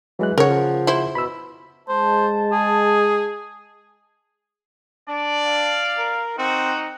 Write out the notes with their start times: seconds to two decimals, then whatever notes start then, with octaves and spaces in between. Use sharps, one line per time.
0.19 E3 F#3 G#3 F#6
0.38 G#2 C#3 G#4 A#4 C#5 F#5
0.49 F3
0.87 E4 C5
1.15 B2 B5 E6
1.89 G#3 C5 A5
2.52 G#4
5.08 D4 D5
5.46 F5
5.98 A#4
6.38 C4 D#4 F#4